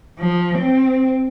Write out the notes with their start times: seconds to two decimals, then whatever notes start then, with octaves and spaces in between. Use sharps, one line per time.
0.19 F3
0.58 C4